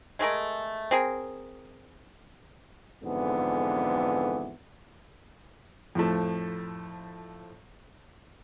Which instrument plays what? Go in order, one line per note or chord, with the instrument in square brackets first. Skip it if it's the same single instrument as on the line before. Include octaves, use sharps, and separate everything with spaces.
[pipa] G#3 A3 G#4 A#4
C4 G#4 A#4
[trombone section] F2 G#2 D3 E3 B3
[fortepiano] F2 A2 F3 A3